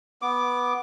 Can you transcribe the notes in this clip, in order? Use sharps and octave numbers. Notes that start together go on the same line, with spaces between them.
B3 D6